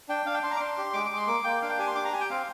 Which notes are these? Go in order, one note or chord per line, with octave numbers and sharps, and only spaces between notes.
D4 G5
D4 F5
G5
D4 C6
A#5
D6
D4 C6
G4
G#3 D6
G#3 D6
C6
A#3 D6
A#3 G5
D4 F5
G5
G4 G#5
C6
D4 D6
A#5
G4 G#5
G5
C4 F5